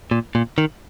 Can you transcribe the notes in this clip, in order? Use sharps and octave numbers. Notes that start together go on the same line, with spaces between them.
A#2
A#2
D#3